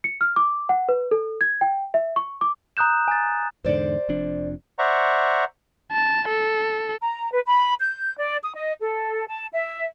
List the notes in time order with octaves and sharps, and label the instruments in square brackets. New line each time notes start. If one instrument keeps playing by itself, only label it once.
[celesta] C#7
F6
D6
F#5
B4
A4
G#6
G5
E5
C#6
D6
[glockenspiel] A#5 D#6 F#6 G6 E7
G#5 A6
[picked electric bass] E2 G#2 D3 [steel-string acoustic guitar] C5 D5
[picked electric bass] F1 F2 D4
[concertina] C5 D5 E5 F#5 A#5 C#6
[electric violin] A5
A4
[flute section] A#5
B4
B5
G6
D5
D#6
D#5
A4
A5
E5